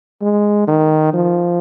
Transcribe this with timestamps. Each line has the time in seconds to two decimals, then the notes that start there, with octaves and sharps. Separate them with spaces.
0.22 G#3
0.67 D#3
1.14 F3